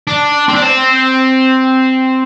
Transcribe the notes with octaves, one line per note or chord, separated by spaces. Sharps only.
D4
C4
D4
C4